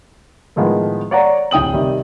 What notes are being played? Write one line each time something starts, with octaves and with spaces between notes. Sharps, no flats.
A2 D#3 F3 G#3 B3
C#5 D5 F#5 A#5
D1 G5 D#6 F#7
C3 D#3 G3